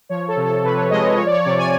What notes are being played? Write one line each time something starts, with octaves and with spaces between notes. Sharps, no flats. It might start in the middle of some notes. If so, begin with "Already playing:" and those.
F3 C#5
A4
C3
A4
C3 B4
C#5
G#3 D#5
C#5
F3 C#5
D5
C#5
C3 D5
G#5